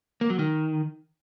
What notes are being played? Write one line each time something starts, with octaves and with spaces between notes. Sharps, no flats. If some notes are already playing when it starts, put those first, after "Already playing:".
A#3
F#3
D#3